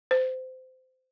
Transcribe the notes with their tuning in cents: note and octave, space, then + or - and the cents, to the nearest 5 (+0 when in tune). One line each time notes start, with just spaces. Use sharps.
C5 -25